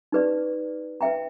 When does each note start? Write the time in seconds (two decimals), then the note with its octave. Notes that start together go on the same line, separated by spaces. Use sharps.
0.12 D#4 G4 B4 D5
1.01 B4 E5 G5 A#5